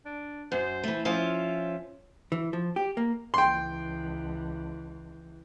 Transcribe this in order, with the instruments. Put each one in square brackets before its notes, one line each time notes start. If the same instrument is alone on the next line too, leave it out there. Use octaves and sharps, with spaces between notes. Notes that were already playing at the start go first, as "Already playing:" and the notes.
[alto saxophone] D4
[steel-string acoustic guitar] F#2 [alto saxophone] C5
[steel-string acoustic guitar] E3 A3
[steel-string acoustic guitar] F3 C#4 F4 [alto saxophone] E5
[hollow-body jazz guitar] E3
F3
G4
A#3
[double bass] C#2 E3 [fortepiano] G5 C6